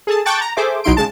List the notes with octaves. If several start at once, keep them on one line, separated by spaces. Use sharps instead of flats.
G#4 A4 A5
G5 A5 C#6 D6 F#6 A6
A#5
G#4 A4 C5 E5 D6
B1 F#3 D#4 E4 C6 D7
C#3 G#3 A5